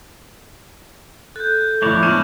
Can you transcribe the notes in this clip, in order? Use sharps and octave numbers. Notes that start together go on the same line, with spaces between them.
A4 F#6 G6
F2 A2 A3 C#5 D5 A#6 E7
G#3 B3 D4 F6 G#6 E7